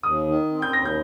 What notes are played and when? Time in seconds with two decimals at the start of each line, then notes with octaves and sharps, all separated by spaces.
0.03 D#2 D#6
0.27 D#3
0.51 C4
0.62 G6
0.73 D#2 A#6
0.85 G6